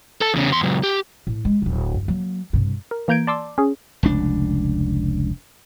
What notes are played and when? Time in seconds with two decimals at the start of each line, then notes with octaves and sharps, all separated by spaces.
0.21 A4 A5
0.34 E2 C#3
0.50 E2 C6
0.63 C#2 F#3
0.83 G4
1.27 A2
1.45 G#3
1.62 D1 G1
1.94 G2
2.08 F#3 A#3
2.53 G2 C3
2.91 A#4
3.08 E3 A#3 A#5 G6 G#6 D7
3.27 D5 A5 C6 D6 E6
3.58 C#4 G#4
4.03 F1 C#2 D4